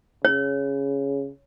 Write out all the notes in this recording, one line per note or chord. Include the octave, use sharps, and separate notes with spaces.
C#3 C#5